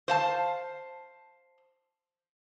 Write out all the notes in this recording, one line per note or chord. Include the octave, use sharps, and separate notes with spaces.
C5 F5 A5